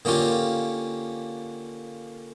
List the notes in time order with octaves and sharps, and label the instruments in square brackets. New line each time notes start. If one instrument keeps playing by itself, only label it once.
[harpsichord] D3 A#3 C#4 F4 G4